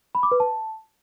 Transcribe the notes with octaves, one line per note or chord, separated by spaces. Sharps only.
B5
D6
B4
A5